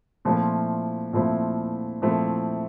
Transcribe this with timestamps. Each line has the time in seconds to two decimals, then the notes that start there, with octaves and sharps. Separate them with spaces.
0.25 A#2 F3 A3 C4 E4
1.13 A#2 F3 A3 C4 E4
2.01 A#2 F3 A3 C4 E4